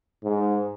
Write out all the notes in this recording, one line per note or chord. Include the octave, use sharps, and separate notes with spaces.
G#2